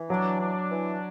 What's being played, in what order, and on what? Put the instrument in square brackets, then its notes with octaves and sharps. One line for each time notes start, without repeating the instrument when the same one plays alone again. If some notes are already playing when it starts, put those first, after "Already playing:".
Already playing: [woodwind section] E3
[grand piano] F#3 [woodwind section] D4
[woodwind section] D4
E3